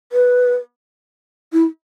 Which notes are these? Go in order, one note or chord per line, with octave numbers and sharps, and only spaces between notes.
B4
E4